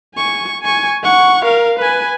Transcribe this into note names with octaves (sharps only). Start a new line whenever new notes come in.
G#5 C#6
G#5 C#6
F#5 C#6
A#4 F5
B4 G#5